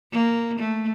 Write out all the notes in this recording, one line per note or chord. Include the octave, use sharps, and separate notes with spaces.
A#3
A3